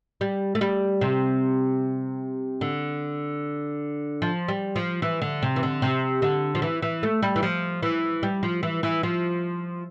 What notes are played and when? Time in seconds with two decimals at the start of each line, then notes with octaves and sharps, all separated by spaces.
0.21 G3
0.55 A3
0.61 G3
1.01 C3
2.61 D3
4.22 F3
4.48 G3
4.76 F3
5.02 E3
5.22 D3
5.42 C3
5.56 E3
5.63 D3
5.82 C3
6.22 D3
6.55 F3
6.62 E3
6.82 E3
7.03 A3
7.23 G3
7.36 E3
7.43 F3
7.83 E3
8.23 G3
8.43 F3
8.63 E3
8.83 E3
9.03 F3